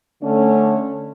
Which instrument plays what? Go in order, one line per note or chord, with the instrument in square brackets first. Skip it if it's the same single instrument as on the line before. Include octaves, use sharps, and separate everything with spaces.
[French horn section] D3 A3 C#4